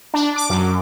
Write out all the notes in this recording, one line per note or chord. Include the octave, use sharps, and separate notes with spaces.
D4
D6
F#2